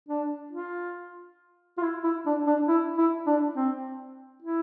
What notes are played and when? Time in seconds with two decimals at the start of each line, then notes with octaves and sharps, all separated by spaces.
0.08 D4
0.52 F4
1.77 F4
1.82 E4
2.04 E4
2.26 D4
2.47 D4
2.68 E4
2.98 E4
3.27 D4
3.55 C4
4.42 E4